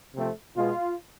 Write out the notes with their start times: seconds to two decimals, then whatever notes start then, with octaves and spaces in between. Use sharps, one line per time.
0.15 C3 F3 A3 C4
0.56 B2 G#3 B3 F4